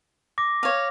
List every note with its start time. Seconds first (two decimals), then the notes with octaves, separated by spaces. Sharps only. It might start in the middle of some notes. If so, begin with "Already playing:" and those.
0.38 D6 A#6
0.63 C#5 F5